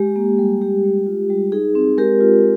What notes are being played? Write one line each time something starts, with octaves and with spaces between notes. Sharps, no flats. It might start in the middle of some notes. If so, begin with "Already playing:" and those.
Already playing: G#3 G4
A#3
G3
G#3 G4
G#3
F4
G3
D#4 G#4
C4
G#3 G4 A#4
F4